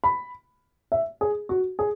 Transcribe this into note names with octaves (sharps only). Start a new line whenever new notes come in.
B5
E5
G#4
F#4
G#4